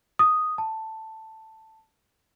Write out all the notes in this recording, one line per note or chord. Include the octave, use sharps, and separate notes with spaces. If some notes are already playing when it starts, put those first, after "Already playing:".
D#6
A5